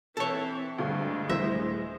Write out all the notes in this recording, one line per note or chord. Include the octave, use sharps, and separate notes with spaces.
E3 C4 A4 C#5
D2 G2 G#3 G4
D#1 E3 G3 A3 C5 E5 A#6